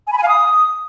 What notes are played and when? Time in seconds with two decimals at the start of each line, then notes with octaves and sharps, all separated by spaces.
0.07 G#5
0.12 B5
0.18 G#5
0.23 F5
0.28 D#6